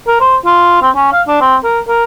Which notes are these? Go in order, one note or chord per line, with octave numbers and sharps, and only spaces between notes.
A#4
C5
F4
C4
C#4
F5
D4
C4
A#4
A#4